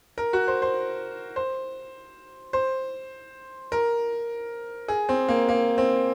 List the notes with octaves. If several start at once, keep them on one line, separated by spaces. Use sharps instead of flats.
A#4
F#4
C5
C5
C5
C5
A#4
G#4
C4
A#3
A#3
C4